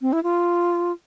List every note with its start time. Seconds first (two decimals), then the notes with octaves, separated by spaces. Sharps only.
0.02 C4
0.13 E4
0.23 F4